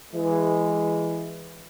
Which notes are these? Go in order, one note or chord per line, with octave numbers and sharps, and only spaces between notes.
E3 G#3